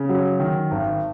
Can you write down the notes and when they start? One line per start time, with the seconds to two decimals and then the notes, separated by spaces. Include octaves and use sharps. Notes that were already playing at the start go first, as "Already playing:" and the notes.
Already playing: C#3
0.09 F#3
0.40 D#3
0.71 G#1